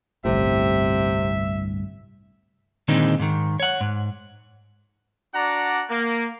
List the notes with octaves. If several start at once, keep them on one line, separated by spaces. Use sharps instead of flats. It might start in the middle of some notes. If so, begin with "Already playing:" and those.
G1 C2 A2 C3 E5
A#2 D3 D#3 G#3 C4 D#4
G#2 D#3
C#5 F#5
G#2
D4 F#4 D5 F#5 A#5
A#3